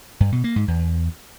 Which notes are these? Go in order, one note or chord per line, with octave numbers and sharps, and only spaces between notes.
G2
B2
A#3
G#2
E2